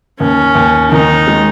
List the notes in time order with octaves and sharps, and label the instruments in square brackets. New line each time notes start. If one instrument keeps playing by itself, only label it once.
[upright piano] D#2 [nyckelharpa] C#4
[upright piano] D#2
[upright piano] D#3 [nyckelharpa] D#4
[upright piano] G#3